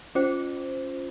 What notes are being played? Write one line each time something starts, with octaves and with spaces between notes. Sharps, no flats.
C#4 F4 C5